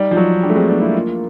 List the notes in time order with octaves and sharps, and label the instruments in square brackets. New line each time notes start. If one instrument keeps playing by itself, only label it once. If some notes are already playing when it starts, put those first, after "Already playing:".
Already playing: [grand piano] G3 [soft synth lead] D#4
[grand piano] F3
F#3
[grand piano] G3 [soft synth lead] D4
[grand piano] A3
[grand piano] G#3 [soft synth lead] C4
[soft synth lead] B3 [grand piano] D4
[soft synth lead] A#3 [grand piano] E4
[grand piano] F4